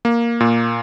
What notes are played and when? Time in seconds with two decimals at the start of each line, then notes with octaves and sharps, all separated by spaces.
0.05 A#3
0.40 A#2